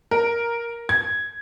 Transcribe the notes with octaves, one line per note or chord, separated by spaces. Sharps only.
A#4
G#6